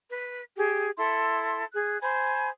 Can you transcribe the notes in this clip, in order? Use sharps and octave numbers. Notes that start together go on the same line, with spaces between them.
B4
G4 G#4
E4 A4 C6
G#4 F#6
C5 G#5 B5